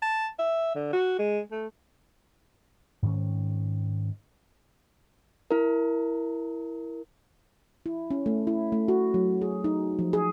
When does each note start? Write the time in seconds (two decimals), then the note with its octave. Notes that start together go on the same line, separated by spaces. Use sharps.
0.02 A5
0.39 E5
0.75 D3
0.93 F#4
1.19 G#3
1.51 A3
3.02 G#2 D#3 C#4
5.51 E4 A#4
7.86 E4
8.11 C#4
8.26 A3
8.47 E4
8.72 A3
8.88 F#4
9.14 F#3
9.42 G#4
9.64 D#4
9.99 F3
10.13 G#4